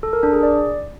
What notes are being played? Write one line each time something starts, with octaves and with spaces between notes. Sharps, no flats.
A4
A#4
D4
G#4
D5